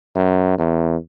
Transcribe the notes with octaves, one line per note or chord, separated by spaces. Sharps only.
F#2
E2